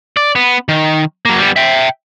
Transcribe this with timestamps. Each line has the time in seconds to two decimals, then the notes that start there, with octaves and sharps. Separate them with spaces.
0.17 D5
0.35 B3
0.69 D#3
1.25 F#3 A#3
1.39 G3 B3
1.56 E5 G5